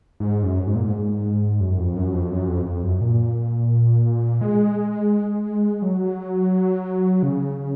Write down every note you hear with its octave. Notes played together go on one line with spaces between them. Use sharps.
G#2
F#2
G#2
A#2
G#2
F#2
F2
F#2
F2
F#2
F2
F2
F#2
A#2
G#3
F#3
C#3